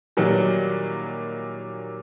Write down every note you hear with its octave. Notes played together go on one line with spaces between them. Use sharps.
A#2 D#3 F#3 G3